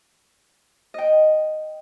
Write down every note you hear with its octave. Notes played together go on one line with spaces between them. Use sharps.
D#5 G5